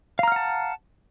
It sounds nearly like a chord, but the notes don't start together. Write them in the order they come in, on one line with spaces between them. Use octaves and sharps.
F5 A#5 F6 F#5 A5